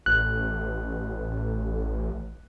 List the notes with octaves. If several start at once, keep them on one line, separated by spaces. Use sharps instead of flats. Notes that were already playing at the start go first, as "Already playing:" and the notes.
A1 F#6